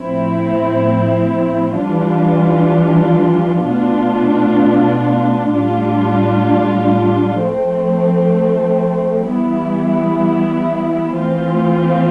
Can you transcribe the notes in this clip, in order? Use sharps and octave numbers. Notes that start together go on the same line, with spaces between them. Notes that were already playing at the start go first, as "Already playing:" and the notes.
Already playing: A2 F3 C4 E4
E3 G3 D4 F4
B2 A3 D4 F4
A2 G3 D4 F4
F3 A3 C4
E3 G3 B3 E4
E3 A3 C4 F4